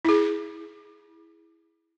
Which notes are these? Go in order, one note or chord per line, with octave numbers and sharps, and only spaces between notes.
E4 G#4